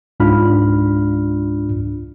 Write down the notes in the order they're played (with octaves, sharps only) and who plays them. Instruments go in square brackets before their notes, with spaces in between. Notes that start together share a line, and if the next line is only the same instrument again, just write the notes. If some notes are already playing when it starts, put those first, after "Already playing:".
[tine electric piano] C#2 G#2 D4 F4 B5 F6